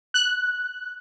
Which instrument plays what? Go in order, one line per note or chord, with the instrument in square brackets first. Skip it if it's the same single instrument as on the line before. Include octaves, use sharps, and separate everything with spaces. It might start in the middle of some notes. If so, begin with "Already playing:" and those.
[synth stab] F#6